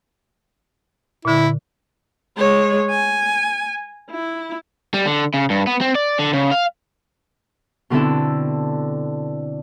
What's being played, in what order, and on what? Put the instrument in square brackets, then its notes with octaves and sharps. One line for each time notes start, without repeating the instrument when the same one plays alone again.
[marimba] A#2 D3 [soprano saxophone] E4
[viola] G#3 C#5
G#5
E4
[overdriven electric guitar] G3
D3
C#3
G2
B3
C4
D5
D3
C#3
F5
[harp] B2 D3 C4 E4 A4